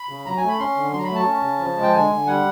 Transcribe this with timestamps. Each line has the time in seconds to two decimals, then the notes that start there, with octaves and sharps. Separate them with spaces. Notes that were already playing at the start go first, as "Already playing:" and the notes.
Already playing: B5
0.09 C#3
0.26 F#3 A#5
0.37 G#5
0.43 A3
0.48 B5
0.59 C#4 C6
0.76 D3
0.93 F#3 C6
0.98 A#5
1.04 B5
1.10 A3
1.15 A5
1.26 C#4
1.43 C#3
1.59 F3
1.76 G#3
1.83 G5
1.93 D3 G#5
2.10 D3
2.26 G3 F#5